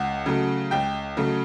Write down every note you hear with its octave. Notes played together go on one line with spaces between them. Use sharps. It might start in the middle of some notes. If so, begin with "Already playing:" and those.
Already playing: C#2 F#5
C#3 F#3 A3
C#2 G5
C#3 F#3 A3